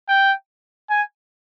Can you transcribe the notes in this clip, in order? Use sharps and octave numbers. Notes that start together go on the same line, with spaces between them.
G5
G#5